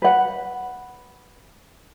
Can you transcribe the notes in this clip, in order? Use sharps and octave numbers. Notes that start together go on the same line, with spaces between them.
B4 F#5